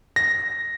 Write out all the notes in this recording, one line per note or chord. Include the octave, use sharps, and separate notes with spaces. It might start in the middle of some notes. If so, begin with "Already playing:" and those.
A#6